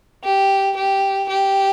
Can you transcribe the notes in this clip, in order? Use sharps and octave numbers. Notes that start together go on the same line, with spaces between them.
G4
G4
G4